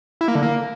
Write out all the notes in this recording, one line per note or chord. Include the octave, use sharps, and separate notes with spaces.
E4
A#3
D3
A#3